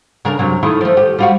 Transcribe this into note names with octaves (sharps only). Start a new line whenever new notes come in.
C#3 D4 A#4
F#2 C3 F#3
D#3 A3 E4
F3 A3
G4
G3 F4 F#4